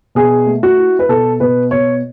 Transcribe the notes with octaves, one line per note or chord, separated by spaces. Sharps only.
B2 G#4
A3
F#4
E4
B4
B2 A4
B2 B4
B2 C#5